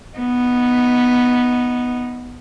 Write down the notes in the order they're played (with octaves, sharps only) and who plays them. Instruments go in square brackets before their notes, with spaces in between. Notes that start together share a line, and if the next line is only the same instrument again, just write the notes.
[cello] B3 D#4